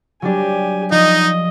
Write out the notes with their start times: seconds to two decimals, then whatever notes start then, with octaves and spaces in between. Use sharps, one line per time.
0.22 F#3 G3 D4 G4 G#5
0.91 F3 D4 D#4 D#5